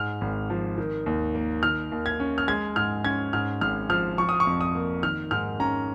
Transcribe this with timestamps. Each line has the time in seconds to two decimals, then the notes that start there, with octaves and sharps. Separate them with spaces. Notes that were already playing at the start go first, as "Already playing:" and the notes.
Already playing: G#2 F6
0.21 G#1
0.50 F3
0.78 D#3
1.06 D#2
1.35 A#3
1.63 D#3 F6
1.92 D#2
2.06 G#6
2.20 C#4
2.38 F6
2.48 G#3 G#6
2.76 G#2 F6
3.05 C#4 G#6
3.33 G#2 F6
3.61 G#1 F6
3.89 F3 F6
4.18 F3 C#6
4.29 D#6
4.40 C#6
4.47 F2
4.61 D#6
4.75 A#3
5.03 D#3 F6
5.31 G#2 F6
5.60 C#4 A#5